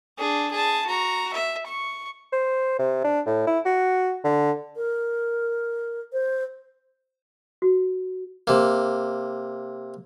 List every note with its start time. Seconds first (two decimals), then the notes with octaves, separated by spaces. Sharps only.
0.18 D4 G#4
0.52 G#4 A5
0.87 F#4 A#5
1.33 E5
1.67 C#6
2.32 C5
2.79 C3
3.04 D4
3.26 A2
3.47 E4
3.65 F#4
4.24 D3
4.77 A#4
6.13 C5
7.62 F#4
8.47 C3 A#3